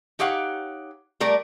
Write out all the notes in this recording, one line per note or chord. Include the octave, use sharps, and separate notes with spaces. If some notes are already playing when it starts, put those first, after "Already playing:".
D#4 G4 C#5 F5 F#5
G3 A3 A#4 D5